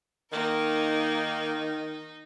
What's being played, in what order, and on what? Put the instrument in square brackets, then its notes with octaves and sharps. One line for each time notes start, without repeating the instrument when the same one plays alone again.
[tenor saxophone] D#3 [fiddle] A#3 A#4 [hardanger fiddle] D#4